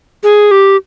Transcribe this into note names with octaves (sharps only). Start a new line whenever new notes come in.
G#4
G4